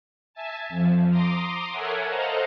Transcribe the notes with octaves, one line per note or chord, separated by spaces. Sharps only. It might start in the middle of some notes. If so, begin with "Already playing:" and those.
E5 G#5 A5
F2 F3
A#5 C6 D6 D#6
A4 A#4 C#5 E5 F#5 G#5
A4 C5 D#5 F5 F#5 A#5